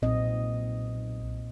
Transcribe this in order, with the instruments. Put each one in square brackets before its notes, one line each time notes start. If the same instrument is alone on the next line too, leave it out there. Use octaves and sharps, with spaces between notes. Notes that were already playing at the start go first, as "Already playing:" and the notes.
[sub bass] B1 [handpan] A#2 C4 D#5